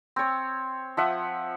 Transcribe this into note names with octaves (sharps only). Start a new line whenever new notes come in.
C4 C#5
F3 E5 F#5